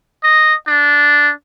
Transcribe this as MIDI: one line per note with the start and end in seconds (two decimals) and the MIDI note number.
0.23 0.54 75
0.68 1.32 62